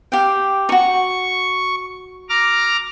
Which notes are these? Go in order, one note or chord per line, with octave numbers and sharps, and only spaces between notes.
G4 F5 G5
D#4 F#4 C#6
A#5 D6 F6